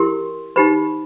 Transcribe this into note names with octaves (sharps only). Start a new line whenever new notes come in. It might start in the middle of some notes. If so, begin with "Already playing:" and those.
Already playing: E4 G4 A#4 C6
D#4 G4 C5 B5